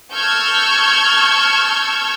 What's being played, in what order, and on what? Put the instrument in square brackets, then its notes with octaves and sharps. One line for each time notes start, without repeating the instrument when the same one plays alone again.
[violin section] A5 C#6 E6 F6 G6 G#6